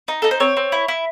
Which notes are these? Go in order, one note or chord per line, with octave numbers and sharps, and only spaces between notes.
D#4
D#4 A4
C5
C4 C#5
C4
E4
E4